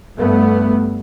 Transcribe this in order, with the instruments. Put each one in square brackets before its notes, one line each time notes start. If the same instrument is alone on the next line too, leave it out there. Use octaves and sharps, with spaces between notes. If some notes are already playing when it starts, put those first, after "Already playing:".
[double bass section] G2 A3 B3